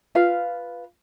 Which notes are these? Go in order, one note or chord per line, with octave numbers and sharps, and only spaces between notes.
F4 B4 F5